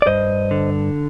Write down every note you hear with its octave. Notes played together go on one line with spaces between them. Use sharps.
D5
G2 C5 D#5
D3